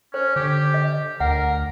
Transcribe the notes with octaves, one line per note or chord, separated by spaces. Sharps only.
C#4 C5
D3 G4
D#5
D2 A#4 F#5